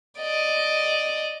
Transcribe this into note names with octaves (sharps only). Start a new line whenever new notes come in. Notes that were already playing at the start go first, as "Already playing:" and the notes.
D5 D#5